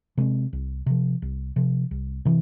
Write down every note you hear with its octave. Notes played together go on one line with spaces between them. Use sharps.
C3 G#3 C4
C2
C3 F3
C2
C3 F3
C2
C3 E3